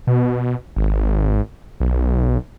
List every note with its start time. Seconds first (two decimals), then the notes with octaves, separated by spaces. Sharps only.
0.07 B2
0.76 G#1
1.80 B1